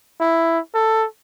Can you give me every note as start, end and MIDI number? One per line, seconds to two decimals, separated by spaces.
0.20 0.59 64
0.74 1.05 69